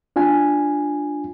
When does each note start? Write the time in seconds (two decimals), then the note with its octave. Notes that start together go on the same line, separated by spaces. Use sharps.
0.16 D4 F4 G#5